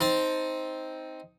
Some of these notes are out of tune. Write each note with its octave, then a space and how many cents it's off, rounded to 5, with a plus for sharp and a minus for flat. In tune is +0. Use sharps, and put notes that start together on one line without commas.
C4 +0 D#4 +15 A5 +0